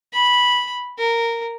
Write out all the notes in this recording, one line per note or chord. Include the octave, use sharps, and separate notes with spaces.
B5
A#4